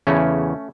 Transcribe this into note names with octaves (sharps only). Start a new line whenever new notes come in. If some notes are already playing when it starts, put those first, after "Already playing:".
E2 C#3 E3 A3 C#4